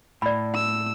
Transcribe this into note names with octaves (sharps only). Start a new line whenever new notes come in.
A2 D5 B5
E6